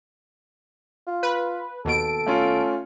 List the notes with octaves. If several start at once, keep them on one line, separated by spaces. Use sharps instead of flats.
F4
B4
D#2 B2 A4 D7
A3 C#4 F4